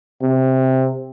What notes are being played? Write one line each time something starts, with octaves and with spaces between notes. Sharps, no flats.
C3